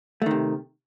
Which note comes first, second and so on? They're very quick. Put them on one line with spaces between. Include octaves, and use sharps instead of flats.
A3 D#3 C3